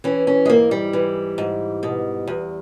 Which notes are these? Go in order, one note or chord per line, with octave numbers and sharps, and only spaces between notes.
E3 C#4
C#4
G#3
G#2 A#3
G3
E3
G#2
B2
E2